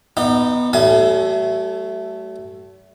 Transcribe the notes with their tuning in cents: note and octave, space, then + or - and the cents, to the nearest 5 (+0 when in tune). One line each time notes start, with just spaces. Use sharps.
B3 +0 D#4 +0 D5 +45
F#3 +45 A3 +0 G#5 +25